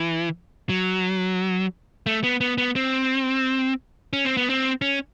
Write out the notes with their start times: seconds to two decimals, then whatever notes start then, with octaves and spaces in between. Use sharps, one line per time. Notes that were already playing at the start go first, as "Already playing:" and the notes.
Already playing: E3
0.69 F#3
2.06 A3
2.24 B3
2.41 B3
2.58 B3
2.76 C4
4.13 C#4
4.25 C4
4.37 B3
4.50 C4
4.82 C#4